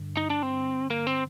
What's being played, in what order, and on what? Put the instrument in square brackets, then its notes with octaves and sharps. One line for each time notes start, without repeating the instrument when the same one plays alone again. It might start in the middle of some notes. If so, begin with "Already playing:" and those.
Already playing: [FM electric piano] G2 D3
[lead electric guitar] D#4
D4
C4
A#3
C4